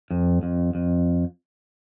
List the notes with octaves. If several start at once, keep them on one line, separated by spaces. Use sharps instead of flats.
F2
F2
F2